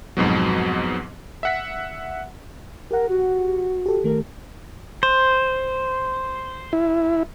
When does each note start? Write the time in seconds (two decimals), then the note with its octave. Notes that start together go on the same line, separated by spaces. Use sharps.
0.17 F2 G#2 B2 F#3
1.43 E5 F#5 B6
2.91 G4 A#4 F#5
3.09 F#4
3.86 G4 A4
4.04 D#3 A3 G4 A#4
5.03 C5
6.73 E4